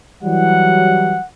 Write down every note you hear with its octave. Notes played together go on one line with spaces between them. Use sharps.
E3 F#3 G3 F#5